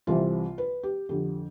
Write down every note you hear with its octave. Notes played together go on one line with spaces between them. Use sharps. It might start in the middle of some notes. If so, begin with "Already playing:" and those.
C2 C3 E3 F4
B4
G4
F2 D3 G4